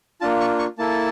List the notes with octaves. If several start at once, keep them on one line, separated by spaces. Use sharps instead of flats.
A#3 D4 F4 A5
C#6
C#6
A#3 E4 A4 A5